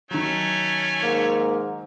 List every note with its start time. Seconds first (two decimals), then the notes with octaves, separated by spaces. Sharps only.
0.11 D#3 F#3 A3 C#4 G#5
1.02 G#2 A#3